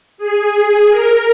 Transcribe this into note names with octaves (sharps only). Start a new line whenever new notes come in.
G#4
A#4